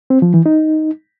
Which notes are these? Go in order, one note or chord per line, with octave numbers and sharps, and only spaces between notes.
C4
F3
E3
D#4